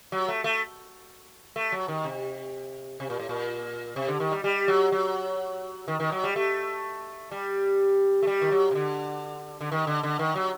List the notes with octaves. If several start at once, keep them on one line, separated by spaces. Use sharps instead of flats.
F#3
A3
A3
A3
F#3
D#3
C3
C3
A#2
A2
A#2
C3
D3
D#3
G3
G3
F#3
F#3
D#3
D#3
F#3
G3
A3
G3
A3
G3
D#3
F#3
C3
D3
D3
D#3
D3
D3
D#3
F#3